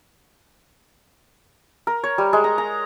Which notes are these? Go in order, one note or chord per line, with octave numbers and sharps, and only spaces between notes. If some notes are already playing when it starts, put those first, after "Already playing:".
A#4
C#5
G3
G#3
A#5
A#5